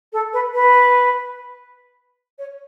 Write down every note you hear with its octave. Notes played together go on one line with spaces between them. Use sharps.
A4
B4
B4
C#5